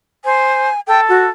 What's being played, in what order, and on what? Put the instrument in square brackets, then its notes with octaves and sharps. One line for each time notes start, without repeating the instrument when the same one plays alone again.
[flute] C5 [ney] G#5
[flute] A4 [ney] G5
[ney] F#4